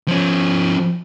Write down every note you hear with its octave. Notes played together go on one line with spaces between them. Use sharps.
F3 C#4